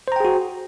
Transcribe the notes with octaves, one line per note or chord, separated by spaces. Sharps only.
F#4 G#4 C5 G5 A#5